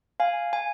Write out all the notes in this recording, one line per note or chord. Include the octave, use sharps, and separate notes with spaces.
F5 G#5
G#5